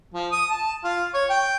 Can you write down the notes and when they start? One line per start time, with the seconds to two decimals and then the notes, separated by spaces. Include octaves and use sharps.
0.14 F3
0.32 D#6
0.50 A5
0.84 F4
1.14 C#5
1.29 G5